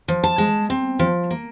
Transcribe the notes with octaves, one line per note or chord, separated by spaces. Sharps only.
F3
A5
G#3
C4
F3
A#3